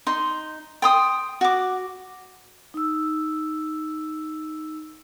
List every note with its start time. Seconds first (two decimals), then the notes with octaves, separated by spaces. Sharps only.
0.07 D#4 C6
0.82 G5 C6 D#6
1.41 F#4 D6
2.74 D#4 E6